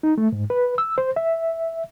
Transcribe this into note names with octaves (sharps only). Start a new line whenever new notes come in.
D#4
A3
G#2
B4
E6
C5
E5